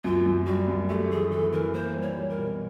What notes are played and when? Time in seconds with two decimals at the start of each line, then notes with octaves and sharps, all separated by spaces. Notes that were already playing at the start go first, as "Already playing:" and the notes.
0.04 F#2 F4
0.26 F#2
0.46 G3 F#4
0.68 F#2
0.89 A3 G4
1.10 E3 G#4
1.31 E3 A4
1.53 E3 A#4
1.74 A#3 C5
1.95 G3
2.02 C#5
2.16 G3
2.30 A#4
2.37 B2